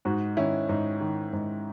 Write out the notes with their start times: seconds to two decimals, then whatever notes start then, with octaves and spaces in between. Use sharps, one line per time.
0.05 G#2 D#4 F#4
0.37 D#3 C#4 E4
0.69 G#2 D#4
1.01 D#3
1.33 G#2